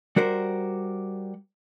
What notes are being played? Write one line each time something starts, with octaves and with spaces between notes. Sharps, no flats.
G3 F#4 A#4 C5